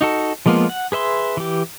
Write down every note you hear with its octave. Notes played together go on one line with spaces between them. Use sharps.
D#4 F#4 A4
F3 G#3 A#3 B3 F4
F#5
G#4 B4 E5 C6
E3 G4